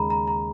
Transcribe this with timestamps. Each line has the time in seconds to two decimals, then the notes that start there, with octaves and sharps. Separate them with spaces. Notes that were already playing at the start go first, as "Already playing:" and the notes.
Already playing: D#2 C#3 G#3 A#5 B5
0.10 A#5
0.28 A#5